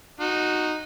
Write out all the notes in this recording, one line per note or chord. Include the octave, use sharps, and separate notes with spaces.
D#4 F#4